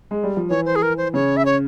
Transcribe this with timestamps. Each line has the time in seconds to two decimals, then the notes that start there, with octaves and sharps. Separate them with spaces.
0.11 G#3
0.23 G3
0.37 F3
0.49 E3 C#5
0.66 C5
0.76 G#4
0.82 A#4
0.97 C5
1.14 C#3 C#5
1.37 E5
1.45 C#5